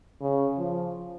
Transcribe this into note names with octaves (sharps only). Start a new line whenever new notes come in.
C#3
F3